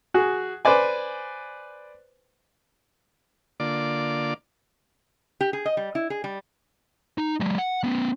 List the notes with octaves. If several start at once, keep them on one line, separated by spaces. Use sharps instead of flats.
F#4 G#4
B4 C5 D5 G#5
D3 A#3 F4 D5 D6
G4
G#4
D#5
G3
E4
G#4
G3
D#4
F#3 G#3
F#5
B3 C#4